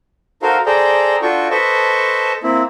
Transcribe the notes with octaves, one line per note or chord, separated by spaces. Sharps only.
D#4 F#4 A4 A#4 C5 F5
G#4 A4 C5 D5 G5 A#5
D4 F4 F#4 A4 G5 C#6
A4 B4 C5 D#5 A5 C#6
A#3 C4 E4